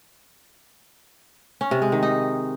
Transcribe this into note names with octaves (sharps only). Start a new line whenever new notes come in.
C#4
C3
G#3
D#3
D#4